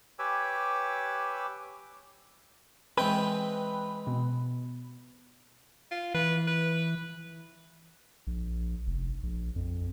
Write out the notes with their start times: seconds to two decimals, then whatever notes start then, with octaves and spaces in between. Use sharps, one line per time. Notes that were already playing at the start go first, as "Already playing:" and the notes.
0.19 G4 B4 C#5 G#5 D6 E6
2.98 E3 G#3 C4 B4 G5
4.07 B2
5.91 F4
6.15 E3 B4
6.47 B4
8.27 A#1
8.87 F1
9.23 A#1
9.56 F2